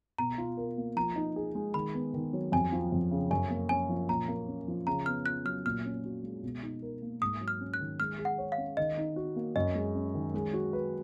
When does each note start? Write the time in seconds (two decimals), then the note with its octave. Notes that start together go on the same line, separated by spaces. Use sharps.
0.18 B2 A#5
0.38 F4
0.57 A#4
0.78 A#3
0.96 F3 A#5
1.16 D#4
1.36 G#4
1.55 G#3
1.74 D#3 B5
1.94 B3
2.14 D#3
2.33 F#3
2.52 F2 G#5
2.72 F3
2.92 F2
3.11 C#3
3.31 F#2 G#5
3.50 A#3
3.69 C#4 G#5
3.89 F3
4.09 A#2 A#5
4.28 A#3
4.48 C#4
4.68 F3
4.87 C#3 A#5
5.06 B3 F6
5.26 F4 F#6
5.45 F#3 F6
5.66 A#2 F6
5.85 C#4
6.04 F#4
6.23 G#3
6.43 B2
6.63 D#4
6.82 A#4
7.02 A#3
7.21 G#2 D#6
7.41 F#3
7.48 F6
7.61 C#4
7.74 F#6
7.80 D#3
8.00 G#3 F6
8.19 G#4
8.25 F#5
8.38 C#5
8.52 F5
8.58 C#4
8.77 D#3 D#5
8.97 D#4
9.16 F#4
9.36 A#3
9.56 F#2 D#5
9.75 G#3
9.95 C#4
10.14 D#3
10.34 G#3
10.53 F#4
10.73 B4